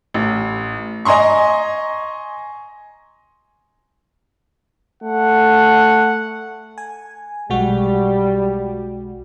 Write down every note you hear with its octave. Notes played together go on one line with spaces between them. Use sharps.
A1
D#5 G#5 A#5 C6 C#6
A3 F#5
G#5
B1 G3 G#3 F#4